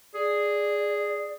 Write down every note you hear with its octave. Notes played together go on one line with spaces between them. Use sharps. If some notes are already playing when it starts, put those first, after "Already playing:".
G#4 D5